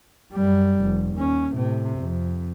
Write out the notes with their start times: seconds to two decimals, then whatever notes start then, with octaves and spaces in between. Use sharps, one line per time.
0.33 F#2 G3
0.82 F1
1.17 D#2 C#4
1.54 A2 C3
1.99 F2